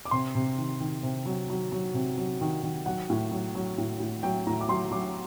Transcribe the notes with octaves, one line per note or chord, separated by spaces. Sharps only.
D6
C3 C6
C3
D#3
D#3
C3
F#3
F#3
F#3
C3
F#3
D#3
D#3
F#3 F#5
A2
F#3
F#3
A2
A2
F#3 G5
A2 A#5
D6
F#3 C6
F#3 D6